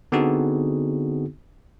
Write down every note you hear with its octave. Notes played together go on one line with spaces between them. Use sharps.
D3 B3 C4 D#4 F#4 G#4